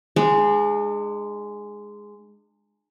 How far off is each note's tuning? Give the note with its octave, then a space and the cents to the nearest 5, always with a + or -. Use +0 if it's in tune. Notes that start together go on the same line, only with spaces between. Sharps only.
G#3 +0 D4 +45